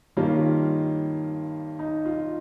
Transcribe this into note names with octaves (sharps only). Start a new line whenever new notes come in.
G2 D#3 G3 A#3 C#4 F4
D#4
F4